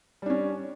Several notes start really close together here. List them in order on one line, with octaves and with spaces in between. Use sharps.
G3 D4 C#4